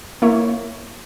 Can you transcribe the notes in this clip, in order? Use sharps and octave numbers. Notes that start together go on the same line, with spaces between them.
A#3 E4 C#5